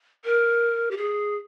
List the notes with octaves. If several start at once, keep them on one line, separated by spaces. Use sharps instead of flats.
A#4
G4
G#4